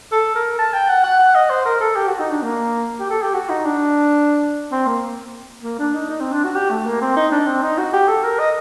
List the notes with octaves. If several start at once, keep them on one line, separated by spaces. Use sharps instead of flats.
A4
A#4
A5
G5
F#5
F#5
F#5
D#5
C5
A#4
A4
G4
F#4
D#4
D4
A#3
G4
A4
G4
F#4
D#4
D4
C4
A#3
A#3
D4
D#4
D#4
C4
D4
F#4
G4
A3
A#3
C4
D#4
D4
C4
D#4
F#4
G4
A4
A#4
D#5